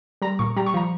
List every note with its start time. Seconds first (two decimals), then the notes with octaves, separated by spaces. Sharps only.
0.22 G3 A#5
0.39 A#2 C#6
0.56 G3 A#5
0.66 C#6
0.74 F3 A#5